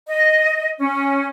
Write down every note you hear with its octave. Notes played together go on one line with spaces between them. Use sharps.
D#5
C#4